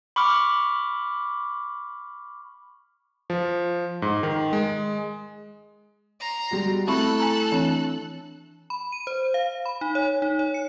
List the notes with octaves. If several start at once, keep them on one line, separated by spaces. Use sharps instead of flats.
B5 C#6 D6 F6
F3
G#2
D#3
G#3
A#5 C6
G3 G#3 F#4
A3 C4 E4 A4 B5 C#6 F#6
G#5 A#5
E3 C4 D4
B5
D#7
C5
F5
B5
D#4
C#5
D#4
C#5
C#7